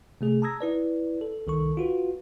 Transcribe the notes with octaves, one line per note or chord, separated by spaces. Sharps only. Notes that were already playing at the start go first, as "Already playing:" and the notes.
C3 A3 G#4
A5 A#5 D#6 E6 G#6 A#6
E4 B4 D5
A4
C2 D#3 A4 C#6
F4 F#4 B4